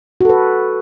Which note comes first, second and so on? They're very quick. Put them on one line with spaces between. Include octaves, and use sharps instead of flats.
F#4 A4 B4